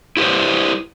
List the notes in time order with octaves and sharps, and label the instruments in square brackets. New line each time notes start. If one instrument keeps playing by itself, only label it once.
[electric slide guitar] E4 G4 B4 C5